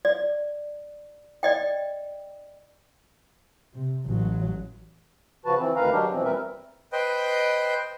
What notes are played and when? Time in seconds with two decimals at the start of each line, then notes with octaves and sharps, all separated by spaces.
0.05 D5
1.43 D5 D#5 G5
3.73 C3
4.06 A1 F#3
5.45 C#3 F3 F#4 B4 A5
5.58 E3 C4
5.76 D2 D#3 B4 F5 A#5
5.92 F#3 G#3 D4 G4
6.12 B2 E3 F3 C4
6.25 D#2 G3 C4 A#4 B4 E5
6.92 B4 C5 D#5 G5